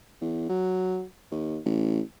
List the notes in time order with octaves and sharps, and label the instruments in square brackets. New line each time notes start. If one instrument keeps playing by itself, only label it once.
[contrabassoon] E2
F#3
D#2
A1